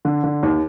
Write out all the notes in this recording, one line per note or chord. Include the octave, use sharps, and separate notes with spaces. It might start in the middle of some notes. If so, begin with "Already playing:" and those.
D3
D3
D#2